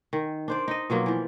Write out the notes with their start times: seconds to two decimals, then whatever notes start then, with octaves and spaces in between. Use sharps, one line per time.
0.13 D#3
0.48 D4 C5 D5
0.68 D#4 D#5
0.90 B2 F3 F#3 A#3
1.06 E3 F3